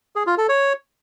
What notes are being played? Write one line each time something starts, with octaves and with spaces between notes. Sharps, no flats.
G#4
F4
A4
C#5